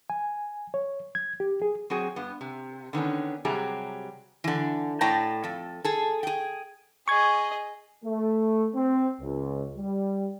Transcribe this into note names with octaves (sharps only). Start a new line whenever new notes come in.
G#5
C#5
G#6
G4
G#4
F#3 C4 F#4 G#4
G2 B3
C3
D3 D#3 B3 C#4
C3 F#3 G3 G4 G#4 A#5
D3 E3
A2 D5 G5 A5 A#5
F2 A4
G#4 A4
G#4 G5
G#4 D#5 C#6 G#6
A3
C4
C#2
G3